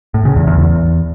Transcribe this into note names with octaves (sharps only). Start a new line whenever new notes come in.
A2
C#3
E2
E2
E2